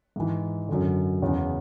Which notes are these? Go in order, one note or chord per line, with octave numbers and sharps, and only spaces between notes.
G#2 E3
F#2 D3
E2 C#3 E3